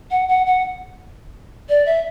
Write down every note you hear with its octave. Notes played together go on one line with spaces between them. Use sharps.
F#5
F#5
F#5
D5
E5